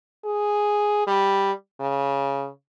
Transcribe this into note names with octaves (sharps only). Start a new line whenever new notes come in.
G#4
G3
C#3